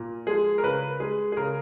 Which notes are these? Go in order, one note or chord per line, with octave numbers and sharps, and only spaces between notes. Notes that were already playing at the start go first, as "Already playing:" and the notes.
Already playing: A#2
F3 G#3 G#4
A#4
C#3 B4
G#3 G#4
G#4
C#3 A#4